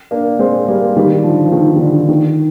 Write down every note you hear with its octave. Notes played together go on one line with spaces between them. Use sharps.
A#3 D4
G#3 C4
G3 A#3
D#3 G3
D3 F3
F3
D#3
D#3
D3
D#3